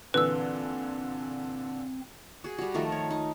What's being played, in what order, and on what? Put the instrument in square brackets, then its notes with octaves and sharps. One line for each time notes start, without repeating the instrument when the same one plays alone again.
[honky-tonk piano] A#2 D3 E3 [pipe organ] C4 [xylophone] B4 E6
[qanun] F#4 G#4
G3 F#4
D#3 F3 A3 A#4
C#5
D#4